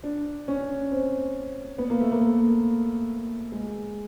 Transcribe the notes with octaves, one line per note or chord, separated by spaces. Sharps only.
D4
C#4
C4
B3
A#3
A3
A#3
G#3